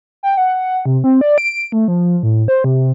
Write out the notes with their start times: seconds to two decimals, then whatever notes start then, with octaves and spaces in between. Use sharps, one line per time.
0.23 G5
0.37 F#5
0.86 C3
1.04 C4
1.21 D5
1.38 D7
1.72 A3
1.88 F3
2.23 A2
2.48 C5
2.64 C3